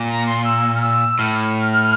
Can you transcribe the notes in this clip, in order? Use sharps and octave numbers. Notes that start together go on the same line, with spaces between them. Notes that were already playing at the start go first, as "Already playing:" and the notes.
Already playing: A#2
A#5
C6
E6
F6
E6
A2 F6